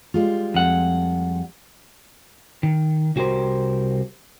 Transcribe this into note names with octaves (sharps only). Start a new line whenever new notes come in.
G3 G#3 F4
F2 F#5
D#3
C2 F#4 G4 A#4 C5